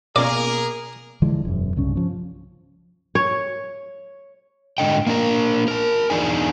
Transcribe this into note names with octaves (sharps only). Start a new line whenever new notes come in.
B2 A#3 C#4 F4 G#4 A#4 D5
D3 E3 F3 G#3
E1 F#2
C2 G2 C#3 C#4
F3 C#4
C#5
G#2 D3 D#5 G5
A#3 D4 A#4
A#4 A5
E2 D4 D#4 G#4 G#5